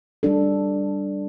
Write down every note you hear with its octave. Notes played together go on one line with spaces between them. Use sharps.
G3 D4 A4